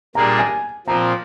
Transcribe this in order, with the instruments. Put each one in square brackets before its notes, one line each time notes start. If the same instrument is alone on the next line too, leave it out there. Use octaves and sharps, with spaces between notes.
[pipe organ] A#2 G3 A#3 D4 G#4 [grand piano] A#5
[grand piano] G#5
[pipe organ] A#2 F3 C4 [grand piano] A#5